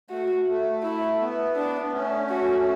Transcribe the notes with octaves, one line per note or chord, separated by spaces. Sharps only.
A3 F#4
A3
E4
B3
D4
B3
A3 C#4
F#4